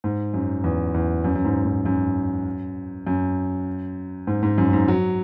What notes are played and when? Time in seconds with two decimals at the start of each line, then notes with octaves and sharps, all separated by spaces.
0.04 G#2
0.34 F#2
0.64 E2
0.94 E2
1.24 F#2
1.35 F#2
1.45 G#2
1.65 G#2
1.86 F#2
3.07 F#2
4.27 G#2
4.43 G#2
4.58 F#2
4.73 G#2
4.88 F#3